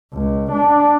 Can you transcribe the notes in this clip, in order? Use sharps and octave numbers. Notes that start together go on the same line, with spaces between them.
C#2
D4